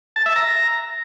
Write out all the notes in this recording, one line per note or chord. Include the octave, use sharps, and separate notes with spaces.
A5
E5
A#5